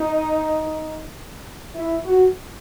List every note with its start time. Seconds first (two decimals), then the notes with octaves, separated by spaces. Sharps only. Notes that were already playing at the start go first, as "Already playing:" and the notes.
Already playing: D#4
1.75 E4
2.05 F#4